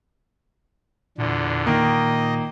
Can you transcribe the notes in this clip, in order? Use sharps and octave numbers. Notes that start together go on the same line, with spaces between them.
E2 A#2 D3
D#3 A#3 D#5